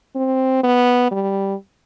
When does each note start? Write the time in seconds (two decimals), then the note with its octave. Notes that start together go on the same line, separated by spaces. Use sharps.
0.16 C4
0.63 B3
1.11 G3